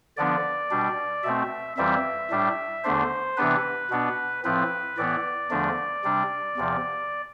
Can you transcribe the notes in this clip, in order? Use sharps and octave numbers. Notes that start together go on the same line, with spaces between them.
D3 F3 B3 D4 D5
B2 G3 D4
B2 A3 C4 E5
F2 E3 G3 C4 E5
A2 G3 D4
E2 D3 A3 D4 C5
C3 E3 B3 D4 B4
B2 B3 D4
A2 F3 C4 B4
A2 E3 B3 D5
E2 D3 F3 A3 D4
C3 G3 D4
E2 C3 F3